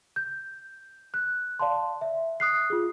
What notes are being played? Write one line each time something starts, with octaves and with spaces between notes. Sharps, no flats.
G6
F#6
D5 F5 A5 C6
E5
D#6 F#6 C7
F4 G#4